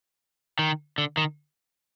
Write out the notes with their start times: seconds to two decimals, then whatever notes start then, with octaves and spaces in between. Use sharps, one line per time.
0.59 D#3
0.98 D3
1.17 D#3